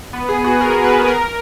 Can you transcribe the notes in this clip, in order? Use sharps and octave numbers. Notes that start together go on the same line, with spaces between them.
B3
G#4
F#4
A#4
B4
A#4